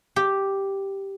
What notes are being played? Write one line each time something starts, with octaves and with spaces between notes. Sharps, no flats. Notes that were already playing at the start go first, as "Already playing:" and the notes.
G4